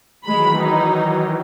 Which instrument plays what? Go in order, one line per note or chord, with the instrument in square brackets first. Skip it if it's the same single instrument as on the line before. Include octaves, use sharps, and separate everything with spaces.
[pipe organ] D#3 E3 F#3 [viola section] G#3 B5
[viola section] D#4